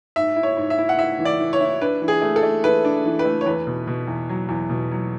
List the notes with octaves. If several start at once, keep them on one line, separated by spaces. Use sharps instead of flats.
G#2 E5
E4
C#5
G#2
E5
E4
F#5
E4 E5
E3
D5
E3
C#5
E4
D4 B4
E3
G#4
A3
A4
A3
E3 B4
D4
E3
B4
A3
C#5
E2 B4
B2
B2
E2
F#3
E2
B2
F#3